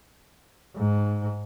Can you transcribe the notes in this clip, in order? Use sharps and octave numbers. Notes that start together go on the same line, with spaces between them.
G#2